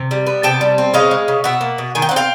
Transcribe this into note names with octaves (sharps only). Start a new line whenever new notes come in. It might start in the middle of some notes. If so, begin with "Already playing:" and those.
Already playing: C3
G3
B3
C3 G5 A5
G3
C4
C#3 D#5 F5
G#3
C#3
B2 E5 F#5
A#3
B2
D#3 G#5
G5
C4 F#5
F5 G5